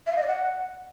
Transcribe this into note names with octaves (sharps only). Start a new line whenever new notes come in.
E5
F5
D#5
D5
F#5